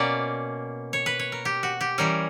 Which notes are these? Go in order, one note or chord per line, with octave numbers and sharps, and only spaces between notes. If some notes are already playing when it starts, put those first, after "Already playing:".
Already playing: B2 A#3 C#4 D5
C#5
B4
C#5
A#4
G4
F#4
G4
E3 G3 C#4 A#4